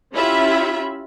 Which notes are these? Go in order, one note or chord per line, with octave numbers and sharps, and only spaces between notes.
C#4 E4 F4 G4 E5 B5